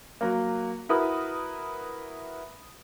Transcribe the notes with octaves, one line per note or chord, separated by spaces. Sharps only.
F#3 A#3
E4 F#4 A#4 B4 D#6